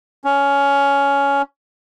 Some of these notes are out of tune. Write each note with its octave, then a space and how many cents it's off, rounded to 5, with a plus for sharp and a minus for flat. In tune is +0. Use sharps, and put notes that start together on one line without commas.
C#4 +15